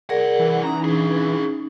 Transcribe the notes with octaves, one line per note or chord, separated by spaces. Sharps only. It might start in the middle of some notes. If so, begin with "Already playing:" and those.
C2 G#4 A#4 D5 F#5
E3
C#4 D#4 A#5
D4 G#4